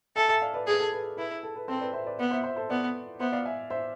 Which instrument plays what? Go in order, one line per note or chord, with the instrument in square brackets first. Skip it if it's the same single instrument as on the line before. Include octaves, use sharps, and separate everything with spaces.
[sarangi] A4 [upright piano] E5 G#5
[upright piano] E5 G#5
D5 F5
B4 D5
[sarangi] G#4 [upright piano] B4
[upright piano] A4
B4
[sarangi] E4 [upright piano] B4
[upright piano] A4
B4
[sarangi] C4 [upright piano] A4 C5
[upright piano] B4 D5
C5 E5
B4 D5
[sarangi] B3 [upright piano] B4 D5
[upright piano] C5 E5
C5 E5
A4 C5
[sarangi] B3 [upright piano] B4 D5
[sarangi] B3 [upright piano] C5 E5
[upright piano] D5 F5
E5 G#5
C5 E5